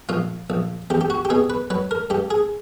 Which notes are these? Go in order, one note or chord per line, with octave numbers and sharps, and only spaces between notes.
A#1 F4
A#1
E2 G4
G4
F#4
G4
B2 G#4
B4
F#3 B4
A#4
G2 G4
G#4